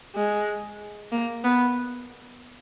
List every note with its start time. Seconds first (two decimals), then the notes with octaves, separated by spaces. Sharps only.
0.15 G#3
1.12 A#3
1.44 B3